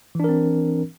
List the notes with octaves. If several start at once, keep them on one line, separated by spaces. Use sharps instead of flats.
E3 C4 D4 A#4